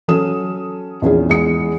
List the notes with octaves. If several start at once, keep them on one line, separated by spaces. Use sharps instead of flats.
F#3 C#4 A4 D#6 E7
A#1 E2 C#4 G#4
E2 G#3 D#6 C#7